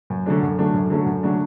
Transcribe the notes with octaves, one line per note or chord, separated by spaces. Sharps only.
F#2
D3 F#3 A3 D4
F#2
D3 F#3 A3 D4
F#2
D3 F#3 A3 D4
F#2
D3 F#3 A3 D4